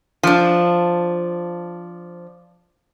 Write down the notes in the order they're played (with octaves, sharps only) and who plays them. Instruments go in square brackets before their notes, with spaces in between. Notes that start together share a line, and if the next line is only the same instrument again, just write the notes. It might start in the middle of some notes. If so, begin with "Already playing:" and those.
[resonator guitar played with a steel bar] F3 D4